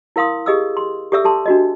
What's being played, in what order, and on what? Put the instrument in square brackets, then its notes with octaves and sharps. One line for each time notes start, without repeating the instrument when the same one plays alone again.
[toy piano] E4 A#4 F5 C6 D#6
G4 G#4 D#5 D#6 E6
C6
G4 A4 D5 E5 E6
G4 A4 A5 C6
D4 F#4 D#5